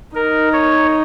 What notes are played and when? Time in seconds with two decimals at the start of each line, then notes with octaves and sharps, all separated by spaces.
0.15 D#4 A#4
0.53 C#5